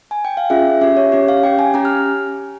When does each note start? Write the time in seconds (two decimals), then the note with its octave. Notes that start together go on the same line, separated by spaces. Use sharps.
0.11 G#5
0.25 G5
0.37 F5
0.50 C#4 F4 G#4 E5
0.81 C#4 G4 E5
0.97 C#5
1.12 C#4 G4
1.28 F5
1.43 C#4 G4 G5
1.59 G#5
1.74 C#4 G4 A#5
1.85 F6